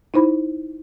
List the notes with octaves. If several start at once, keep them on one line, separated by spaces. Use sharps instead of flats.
D#4 E4 C5 B5